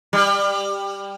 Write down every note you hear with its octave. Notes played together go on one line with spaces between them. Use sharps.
G3